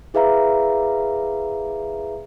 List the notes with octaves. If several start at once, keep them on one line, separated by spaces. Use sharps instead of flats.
E4 G#4 B4 E5 F5 A#5